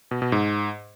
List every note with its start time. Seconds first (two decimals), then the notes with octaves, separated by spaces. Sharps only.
0.11 B2
0.22 B2
0.32 G#2